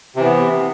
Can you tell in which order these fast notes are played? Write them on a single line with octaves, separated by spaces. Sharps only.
C3 E3 B3